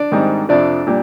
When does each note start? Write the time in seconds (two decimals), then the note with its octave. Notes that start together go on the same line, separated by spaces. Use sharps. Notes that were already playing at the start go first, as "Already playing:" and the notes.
Already playing: D4 D5
0.12 G#2 D#3 G3 C4 D#4
0.49 F2 C3 F3 D4 D5
0.87 A#2 G3